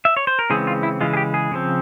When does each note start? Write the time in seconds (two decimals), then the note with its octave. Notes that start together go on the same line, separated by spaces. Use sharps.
0.05 E5
0.17 C#5
0.27 C5
0.39 A#4
0.50 C#3 E3 G#3 C4 G#4
0.67 F4
0.83 E4
1.01 C#3 E3 G#3 F4
1.13 G#4
1.17 G4
1.34 G#4
1.51 C#3 F3 C4